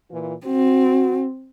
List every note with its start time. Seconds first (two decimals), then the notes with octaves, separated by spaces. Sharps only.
0.10 A#2 E3 F4
0.46 C4 F#4